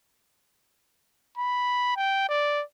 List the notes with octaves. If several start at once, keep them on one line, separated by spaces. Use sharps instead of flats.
B5
G5
D5